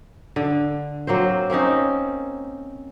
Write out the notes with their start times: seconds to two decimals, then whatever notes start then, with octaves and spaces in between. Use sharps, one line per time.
0.36 D3
1.07 F#3 A#3 C4 C5
1.50 A#3 C4 C#4 D#4